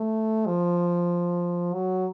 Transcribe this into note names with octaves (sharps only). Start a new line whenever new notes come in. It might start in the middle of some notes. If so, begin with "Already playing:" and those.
Already playing: A3
F3
F#3